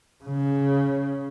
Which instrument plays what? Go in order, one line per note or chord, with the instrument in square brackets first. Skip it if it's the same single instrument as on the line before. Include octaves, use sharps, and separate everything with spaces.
[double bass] C#3